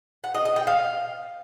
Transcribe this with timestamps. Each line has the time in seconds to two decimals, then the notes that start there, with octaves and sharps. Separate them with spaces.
0.24 F#5
0.34 D#5
0.45 D#5
0.56 G5
0.67 F5